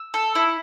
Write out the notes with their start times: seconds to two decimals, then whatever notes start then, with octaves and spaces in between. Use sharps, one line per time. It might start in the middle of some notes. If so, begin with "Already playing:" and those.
Already playing: E6
0.14 A4
0.35 E4